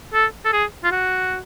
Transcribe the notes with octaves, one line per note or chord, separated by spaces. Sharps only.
A4
A4
G#4
F4
F#4